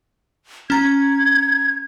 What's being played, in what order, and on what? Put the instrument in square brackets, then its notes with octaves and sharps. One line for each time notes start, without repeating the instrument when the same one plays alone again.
[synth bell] C#4 A#5 [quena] G#6